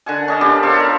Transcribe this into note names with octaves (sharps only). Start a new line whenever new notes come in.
D3 F#5 G#5
C#4 D#5 A5
B3 G4 D5 F5
A4 C5 C#5 F5
F4 A#4